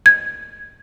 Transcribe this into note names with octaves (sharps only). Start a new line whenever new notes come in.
G#6